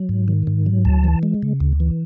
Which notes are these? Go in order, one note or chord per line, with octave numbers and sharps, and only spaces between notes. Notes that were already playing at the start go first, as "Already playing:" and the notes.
Already playing: F#3
G#2
D#3
G#2
F#3
D2 A5
E3
G#3
C#3
D2
E3